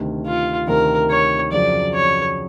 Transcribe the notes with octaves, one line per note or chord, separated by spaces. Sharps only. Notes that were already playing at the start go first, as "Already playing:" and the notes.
Already playing: D2 C3 D#3
F4
D2 C3 D#3 A#4
C#5
F2 C#3 F#3 D5
C#5